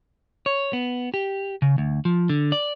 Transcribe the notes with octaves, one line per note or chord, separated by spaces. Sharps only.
C#5
B3
G4
C#3
D2
F3
D3
D5